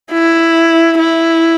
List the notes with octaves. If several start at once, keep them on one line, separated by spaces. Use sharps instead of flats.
E4
E4